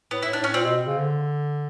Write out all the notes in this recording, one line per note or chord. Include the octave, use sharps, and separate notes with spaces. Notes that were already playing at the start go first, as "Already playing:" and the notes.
A2 B3
A2 E4
D4
A2 C#4
A#2 C4
B2
C#3
D3